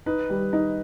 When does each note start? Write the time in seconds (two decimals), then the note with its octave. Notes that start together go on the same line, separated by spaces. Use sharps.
0.06 D#4 B4
0.30 G3
0.53 D#4